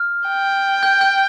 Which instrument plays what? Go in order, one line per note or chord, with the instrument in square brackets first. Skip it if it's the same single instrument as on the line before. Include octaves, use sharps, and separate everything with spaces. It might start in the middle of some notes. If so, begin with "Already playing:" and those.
Already playing: [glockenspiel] F6
[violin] G5
[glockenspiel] G6
G6